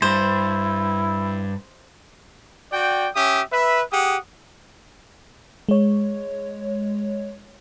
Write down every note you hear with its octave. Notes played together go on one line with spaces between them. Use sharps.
G2 E4 C5
F#4 D5 G5
C#4 G4 E5 D#6
B4 E5
G4 G#4 F#5 D#6
G#3 C#5